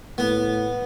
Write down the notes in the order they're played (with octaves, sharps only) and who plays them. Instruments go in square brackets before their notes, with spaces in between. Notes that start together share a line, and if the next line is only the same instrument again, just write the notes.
[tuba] A2 [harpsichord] B3